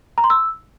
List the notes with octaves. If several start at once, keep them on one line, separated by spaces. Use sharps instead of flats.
A#5
C6
E6